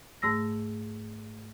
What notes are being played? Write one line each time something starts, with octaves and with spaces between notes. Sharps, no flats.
G#2 A3 E6 A#6